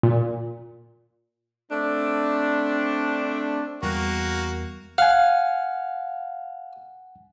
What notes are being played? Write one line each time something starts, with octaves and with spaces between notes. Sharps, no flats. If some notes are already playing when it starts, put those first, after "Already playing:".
A#2
A3 C4 D4
E2 E3 G3 A#3 F#4 F#6 A#6
F5 F#5 G#5